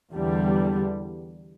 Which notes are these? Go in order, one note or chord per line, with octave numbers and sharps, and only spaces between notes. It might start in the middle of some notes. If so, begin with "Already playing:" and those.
E2 D3 G3